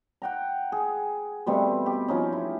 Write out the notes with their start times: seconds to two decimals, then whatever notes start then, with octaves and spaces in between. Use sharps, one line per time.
0.22 F#5 G5 A#5
0.72 G#4
1.47 B2 G3 A3 C4
1.86 G4
2.08 F3 C#4 D#4
2.33 E4